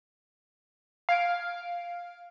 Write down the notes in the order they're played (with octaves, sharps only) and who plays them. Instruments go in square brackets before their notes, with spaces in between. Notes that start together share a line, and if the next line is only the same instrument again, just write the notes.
[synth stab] F5 G#6 D7